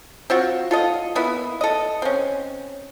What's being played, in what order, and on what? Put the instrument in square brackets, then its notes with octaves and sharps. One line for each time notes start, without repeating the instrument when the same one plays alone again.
[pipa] C4 F4 F#4
F4 A4 D#5
A#3 B3 E4
A4 D#5
C4 C#4